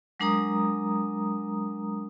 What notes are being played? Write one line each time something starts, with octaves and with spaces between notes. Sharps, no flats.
F#3 G#3 D4 A#4 A#5 D#6